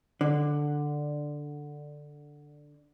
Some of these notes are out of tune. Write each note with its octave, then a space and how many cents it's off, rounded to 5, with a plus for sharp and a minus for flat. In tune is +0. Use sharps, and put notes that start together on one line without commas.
D3 +5